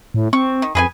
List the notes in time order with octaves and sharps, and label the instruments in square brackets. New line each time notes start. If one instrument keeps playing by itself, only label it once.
[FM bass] A2
[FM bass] C4 [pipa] C#6
[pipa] D#3
[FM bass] F2 [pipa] G#4 B4 G#5